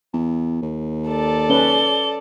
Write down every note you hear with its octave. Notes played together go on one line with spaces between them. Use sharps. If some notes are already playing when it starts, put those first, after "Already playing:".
E2
D#2
A4 D5
C#4 B4 G7